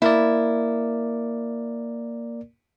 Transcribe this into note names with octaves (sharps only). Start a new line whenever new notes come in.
A#3 E4 A#4 D5